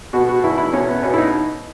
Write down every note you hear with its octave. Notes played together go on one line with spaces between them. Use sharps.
B2 F#4
F#4
E2 E4
E4
B2 C#4
B3
B2 C#4
E4
D#4